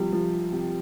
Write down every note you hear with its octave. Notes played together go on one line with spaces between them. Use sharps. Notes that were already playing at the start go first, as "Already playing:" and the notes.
Already playing: C3 F3 G3
F3
C3